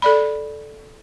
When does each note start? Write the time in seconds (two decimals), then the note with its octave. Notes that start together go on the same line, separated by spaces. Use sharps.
0.02 A4 D5 B5